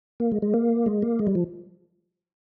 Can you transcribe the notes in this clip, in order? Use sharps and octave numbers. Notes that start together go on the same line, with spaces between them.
A#3
G#3
G#3
A#3
G#3
A#3
G#3
G3
F3